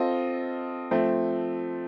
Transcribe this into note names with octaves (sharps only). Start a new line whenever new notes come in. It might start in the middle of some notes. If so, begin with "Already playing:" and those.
Already playing: C4 F4 A4 D#5
F3 A3 C4